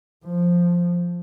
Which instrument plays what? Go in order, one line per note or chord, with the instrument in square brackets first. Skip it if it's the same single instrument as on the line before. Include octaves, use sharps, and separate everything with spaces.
[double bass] F3